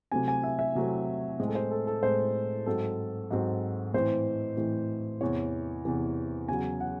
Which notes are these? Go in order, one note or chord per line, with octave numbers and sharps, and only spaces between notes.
C3 F#3 A3 C4 G#5
G#5
E5
E5
C3 F#3 A3 C4
A2 G#3 C4
A4
C5
A4
A4
A2 G#3 C4 C5
G#2 F#3 C4 A4
G#2 F#3 C4
A2 E3 C4 C5
A2 E3 C4
E2 C3 E3 C#5
E2 C3 E3
E2 C#3 F#3 G#5
F#5